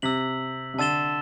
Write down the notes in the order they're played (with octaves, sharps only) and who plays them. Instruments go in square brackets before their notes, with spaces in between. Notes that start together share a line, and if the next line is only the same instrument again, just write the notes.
[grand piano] C3 [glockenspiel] E6 B6 F#7
[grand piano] C3
[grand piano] D3 [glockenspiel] A5 E6 A6 E7 G7